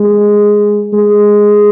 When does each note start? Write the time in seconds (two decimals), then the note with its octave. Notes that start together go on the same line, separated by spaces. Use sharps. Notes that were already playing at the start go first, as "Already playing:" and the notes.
Already playing: G#3
0.93 G#3